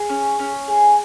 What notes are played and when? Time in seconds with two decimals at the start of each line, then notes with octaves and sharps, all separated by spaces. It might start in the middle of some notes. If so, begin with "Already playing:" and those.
Already playing: G#4
0.09 C#4
0.39 C#4
0.68 G#4